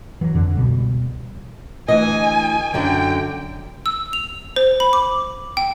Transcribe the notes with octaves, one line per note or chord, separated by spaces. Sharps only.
E3 F#3
F2 D3
C#2 B2 G3
D2 E3 D#5 G#5
F#2 D3 F#3 G5
E6
F7
C5
B5
D6
G5